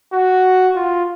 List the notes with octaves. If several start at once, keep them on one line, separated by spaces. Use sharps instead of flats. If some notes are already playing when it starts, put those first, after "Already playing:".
F#4
F4